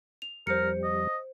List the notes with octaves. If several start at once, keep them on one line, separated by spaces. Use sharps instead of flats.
F7
F2 G3 A#4 C5 C#7
D#5